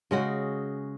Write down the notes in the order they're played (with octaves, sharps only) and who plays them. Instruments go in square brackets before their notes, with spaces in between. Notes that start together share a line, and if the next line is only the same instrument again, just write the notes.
[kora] C#3 G#3 F#4